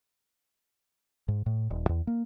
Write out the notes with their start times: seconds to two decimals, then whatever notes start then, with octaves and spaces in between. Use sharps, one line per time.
1.28 G#2
1.46 A2
1.71 D#1
1.89 E2
2.07 A#3